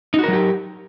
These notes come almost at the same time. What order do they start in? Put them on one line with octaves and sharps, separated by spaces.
D#4 F#4 A#4 F#3 G4